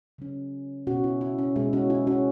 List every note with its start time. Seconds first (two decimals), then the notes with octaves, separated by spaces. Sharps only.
0.18 C#3 F#3 C#4
0.87 B2 B3 C#4 F#4
1.04 E4
1.21 E4
1.39 C#4
1.56 B2 G#3 C#4 E4
1.73 C#4 F#4
1.90 E4
2.07 C#4 F#4